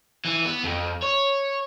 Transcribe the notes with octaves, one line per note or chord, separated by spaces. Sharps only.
E3
B3
F2
C#5